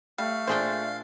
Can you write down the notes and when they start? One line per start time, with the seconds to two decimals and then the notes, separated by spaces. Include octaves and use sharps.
0.18 G3 A3 F5
0.47 A#2 D4 F4 G#4 C5 G5